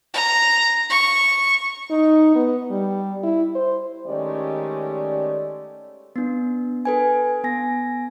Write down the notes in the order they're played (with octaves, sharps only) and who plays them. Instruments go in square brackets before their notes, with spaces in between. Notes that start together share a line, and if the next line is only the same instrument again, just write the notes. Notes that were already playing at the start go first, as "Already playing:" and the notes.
[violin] A#5
C#6
[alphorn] D#4
B3
G3
E4
C5
[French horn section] D#3 G#3 A3 C#4 G4 D5
[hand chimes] B3 D4
A4 B4 G#5
B3 G#5 A#6